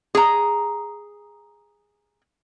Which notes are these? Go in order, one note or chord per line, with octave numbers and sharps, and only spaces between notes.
G#4 A#5